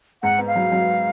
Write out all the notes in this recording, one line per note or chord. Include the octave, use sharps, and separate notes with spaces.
G#2 F#5
B3
F5
F#3
F#3